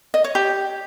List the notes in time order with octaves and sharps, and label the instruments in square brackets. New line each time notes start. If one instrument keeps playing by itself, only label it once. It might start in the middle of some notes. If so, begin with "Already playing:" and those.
[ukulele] D#5
C#5
G4